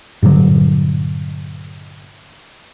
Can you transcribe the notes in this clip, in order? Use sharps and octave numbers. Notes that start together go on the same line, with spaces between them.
G2 A#2 D3 F#3